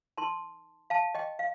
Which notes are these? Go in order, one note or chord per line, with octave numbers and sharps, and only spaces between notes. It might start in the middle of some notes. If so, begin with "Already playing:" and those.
D#4 A#4 A5 C6
F5 A5
D#5 G5
F5